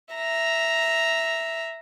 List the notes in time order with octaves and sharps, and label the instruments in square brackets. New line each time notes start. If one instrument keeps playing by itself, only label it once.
[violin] E5 A#5